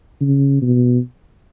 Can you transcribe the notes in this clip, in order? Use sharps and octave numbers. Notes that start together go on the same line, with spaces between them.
C#3
B2